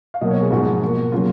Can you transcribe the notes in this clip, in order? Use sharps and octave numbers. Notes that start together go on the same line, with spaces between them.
F5
B2 F#3 A#3 D#5
C#5
G#4
G#2 F3 G#3 F#4
B2 A#3
C#3 F#3 A#3 F4